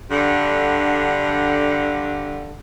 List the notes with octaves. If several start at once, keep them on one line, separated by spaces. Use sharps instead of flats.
G2 D3